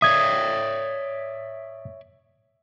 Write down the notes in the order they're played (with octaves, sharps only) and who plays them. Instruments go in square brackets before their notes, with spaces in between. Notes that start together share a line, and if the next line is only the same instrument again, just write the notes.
[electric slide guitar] C#5 D5 E5 [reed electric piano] D#6 G#6